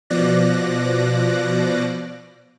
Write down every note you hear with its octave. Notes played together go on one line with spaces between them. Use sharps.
B2 F3 D5 F#6 A#6